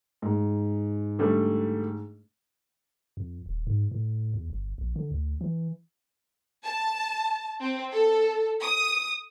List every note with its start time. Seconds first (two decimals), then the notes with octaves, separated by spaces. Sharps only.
0.22 G#2
1.19 D3 G3 A3
3.17 F2
3.46 D#1
3.67 G#2
3.91 A2
4.34 E2
4.50 G1
4.78 A#1
4.96 D3
5.11 D2
5.41 E3
6.64 A5
7.61 C4
7.93 A4
8.62 D#6